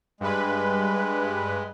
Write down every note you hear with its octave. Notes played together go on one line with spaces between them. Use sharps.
G2 G#3 B4